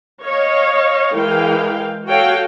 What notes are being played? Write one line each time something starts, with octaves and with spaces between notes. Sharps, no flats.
C#5 D#5 F5
E3 G#3 A#4 F5 G5
F#4 A4 C#5 F5 G5